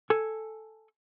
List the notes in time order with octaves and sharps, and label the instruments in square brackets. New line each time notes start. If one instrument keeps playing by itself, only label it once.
[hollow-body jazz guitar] A4 G#5